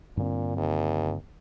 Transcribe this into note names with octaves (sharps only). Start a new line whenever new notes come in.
G2 A#2 D3 C4
D#2